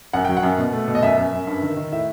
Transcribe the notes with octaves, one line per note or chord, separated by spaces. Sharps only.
F#2 F#5
F#3 G5
F#5
F#2
B2
A3
B2
D#5
F#2 E5
F#2
F#2
G2
D#3
D#3
A2 E5